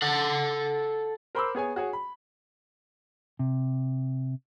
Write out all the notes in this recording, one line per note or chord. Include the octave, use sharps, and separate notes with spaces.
A4 F#5
A#4 C5 B5 C6 D6 E6
B3 G#4 C#5 G#5
F#4 G#4 C#5
B5
C3